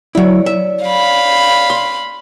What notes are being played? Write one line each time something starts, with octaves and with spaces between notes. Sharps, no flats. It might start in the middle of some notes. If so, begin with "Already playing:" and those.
F#3 E4 C#5 D5
E5
F5 B5
C6